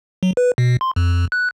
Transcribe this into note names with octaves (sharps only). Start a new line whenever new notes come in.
F#3
B4
B2
C6
F2
F2
F#6